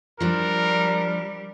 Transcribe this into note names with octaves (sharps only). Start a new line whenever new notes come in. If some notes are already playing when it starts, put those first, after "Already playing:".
F3 G3 D4 A#4